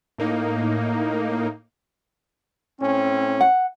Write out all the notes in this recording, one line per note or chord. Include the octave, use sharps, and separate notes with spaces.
A2 A#3 D#4
A2 C4 C#4
F#5